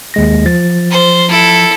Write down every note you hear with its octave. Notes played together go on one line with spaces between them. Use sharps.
D#2 G#3 A#6
F3 A6
C5
E4 A4